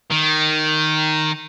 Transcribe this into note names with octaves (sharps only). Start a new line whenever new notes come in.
D#3